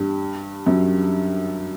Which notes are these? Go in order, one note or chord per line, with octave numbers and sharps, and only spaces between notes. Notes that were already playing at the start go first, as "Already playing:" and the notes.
Already playing: G2
F#2